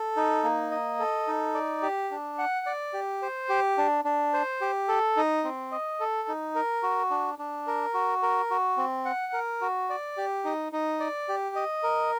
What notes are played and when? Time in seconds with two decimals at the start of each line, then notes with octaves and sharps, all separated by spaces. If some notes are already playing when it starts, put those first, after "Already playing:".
Already playing: A4
0.16 D#4
0.43 A#3
0.71 D#5
0.99 A4
1.27 D#4
1.54 D5
1.82 G4
2.11 D4
2.38 F#5
2.66 D5
2.94 G4
3.22 C5
3.49 G4
3.78 D4
4.05 D4
4.33 C5
4.61 G4
4.88 A4
5.17 D#4
5.44 C4
5.72 D#5
6.00 A4
6.28 D#4
6.55 A#4
6.83 F#4
7.10 D4
7.39 D4
7.67 A#4
7.94 F#4
8.23 A#4
8.51 F#4
8.77 C4
9.05 F#5
9.33 A#4
9.61 F#4
9.90 D5
10.17 G4
10.45 D#4
10.72 D#4
11.00 D5
11.29 G4
11.56 D#5
11.83 A#4